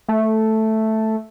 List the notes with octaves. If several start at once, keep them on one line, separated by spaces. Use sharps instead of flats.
A3